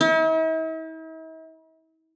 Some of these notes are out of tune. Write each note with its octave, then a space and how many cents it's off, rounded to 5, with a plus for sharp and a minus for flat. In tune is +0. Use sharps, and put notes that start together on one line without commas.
E4 -45